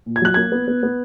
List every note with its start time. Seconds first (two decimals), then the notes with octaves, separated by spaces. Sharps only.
0.06 A#2
0.16 G#6
0.22 F#3 F#6
0.34 A#3 G#6
0.52 B3
0.68 B3
0.83 B3